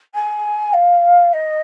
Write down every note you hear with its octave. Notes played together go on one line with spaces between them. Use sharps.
G#5
F5
D#5